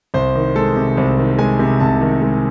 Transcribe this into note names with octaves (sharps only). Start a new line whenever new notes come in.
C2 C5
D#3
G#3 A4
C3
C2 C5
D#3
G#3 G#5
C3
C2 A5
D#3
G#3